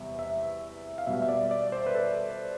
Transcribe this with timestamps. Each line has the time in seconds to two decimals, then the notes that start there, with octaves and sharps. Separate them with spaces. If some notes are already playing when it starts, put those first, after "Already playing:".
Already playing: E2 C3 G3 B3 E5
0.19 E5
0.98 F5
1.07 B2 G3 B3 E5
1.22 E5
1.29 D5
1.51 D5
1.72 C5
1.86 B4
1.95 A4